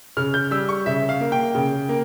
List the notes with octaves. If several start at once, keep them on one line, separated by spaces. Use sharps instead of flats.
C#3 F6
G6
G3 E6
C#6
C#3 E5
F5
A#3
G5
C#3
A#3